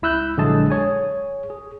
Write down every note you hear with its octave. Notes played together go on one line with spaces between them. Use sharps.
C#2 E4 E6 F#6 G6
A#1 D3 F#3 G#3 G#4 A5
G#4 C#5 G#5
G#4